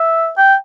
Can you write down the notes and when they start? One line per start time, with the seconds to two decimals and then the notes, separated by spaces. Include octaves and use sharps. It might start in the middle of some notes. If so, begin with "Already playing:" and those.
Already playing: E5
0.38 G5